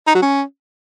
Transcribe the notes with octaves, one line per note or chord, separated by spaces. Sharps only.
D#4
F#3
C#4